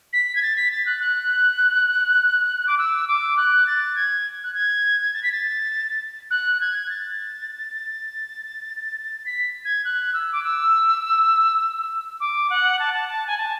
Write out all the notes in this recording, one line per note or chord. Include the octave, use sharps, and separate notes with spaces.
B6
G#6
A6
B6
A6
F#6
F#6
D6
E6
D6
F#6
A6
G#6
F#6
G#6
A6
B6
A6
F#6
G#6
A6
B6
G#6
F#6
E6
D6
E6
D6
F#5
A5
A5
A5
G#5
A5